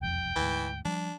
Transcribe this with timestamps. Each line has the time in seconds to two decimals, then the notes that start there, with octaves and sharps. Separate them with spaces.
0.01 E1 C2 F2 G5
0.36 D2 G#2 E3
0.85 F3 G3 D4